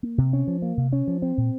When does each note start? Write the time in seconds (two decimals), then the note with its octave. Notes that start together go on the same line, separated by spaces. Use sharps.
0.03 A#3
0.18 C3
0.33 C#4
0.47 F3
0.62 A#3
0.77 C3
0.93 C#4
1.07 F3
1.22 C4
1.37 A#2